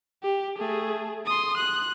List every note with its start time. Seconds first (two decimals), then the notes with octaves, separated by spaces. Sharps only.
0.23 G4
0.58 A3 G#4
1.26 C6 D#6
1.57 F#6